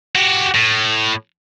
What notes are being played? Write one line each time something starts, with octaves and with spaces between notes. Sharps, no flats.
F#4 G4
A2